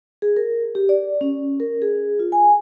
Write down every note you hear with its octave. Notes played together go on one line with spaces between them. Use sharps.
G#4
A#4
G4
D5
C#4
A#4
G#4
F4
G#5